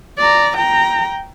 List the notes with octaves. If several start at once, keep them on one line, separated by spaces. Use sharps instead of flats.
D5 A#5
G5 A#5